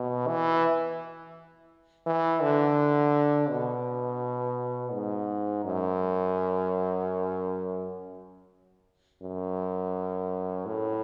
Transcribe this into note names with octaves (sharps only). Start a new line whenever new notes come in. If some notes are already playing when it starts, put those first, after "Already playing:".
Already playing: B2
E3
E3
D3
B2
G#2
F#2
F#2
A2